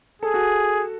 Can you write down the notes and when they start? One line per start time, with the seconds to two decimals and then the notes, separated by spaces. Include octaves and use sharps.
0.22 G#4 A4
0.34 F#4